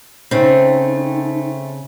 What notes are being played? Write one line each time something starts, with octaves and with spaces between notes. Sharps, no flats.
C#3 A3 C4 D#4